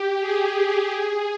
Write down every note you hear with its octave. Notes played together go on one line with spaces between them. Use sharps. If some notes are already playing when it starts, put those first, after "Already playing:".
Already playing: G4
G#4
G4
G#4